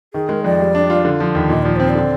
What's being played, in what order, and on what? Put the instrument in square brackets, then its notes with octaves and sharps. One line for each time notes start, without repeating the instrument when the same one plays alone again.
[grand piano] D#3 [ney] G#4
[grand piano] G#3 [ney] A#4
[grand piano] F2 [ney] D5
[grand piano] G3
D4
F4
D3
F3
D#2
[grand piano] A#2 [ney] D#5
[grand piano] F3 [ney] D5
[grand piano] C4 [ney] C5
[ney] D5
[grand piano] D3